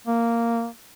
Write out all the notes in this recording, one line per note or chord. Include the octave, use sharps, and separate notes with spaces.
A#3